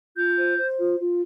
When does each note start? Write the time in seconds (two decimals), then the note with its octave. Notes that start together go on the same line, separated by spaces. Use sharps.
0.17 F4 G6
0.38 C5
0.57 C5
0.78 F4
0.98 F4